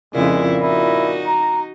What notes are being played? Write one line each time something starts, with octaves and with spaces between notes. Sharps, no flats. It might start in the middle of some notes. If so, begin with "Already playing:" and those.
F2 A#2 C#3 G#3 E4
D#4 E4 F#4
A#5